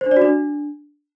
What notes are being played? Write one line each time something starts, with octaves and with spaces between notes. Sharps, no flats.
C5
D4
D5
F#4
D4